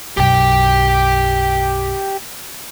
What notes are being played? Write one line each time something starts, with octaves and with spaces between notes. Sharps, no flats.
B1 F#2 G4 G5